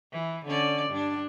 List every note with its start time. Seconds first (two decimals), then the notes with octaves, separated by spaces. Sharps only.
0.12 E3
0.46 D3 C#4 D5
0.90 G2 D4